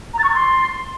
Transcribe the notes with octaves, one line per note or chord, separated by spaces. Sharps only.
A#5
A6
C#6
A6
C6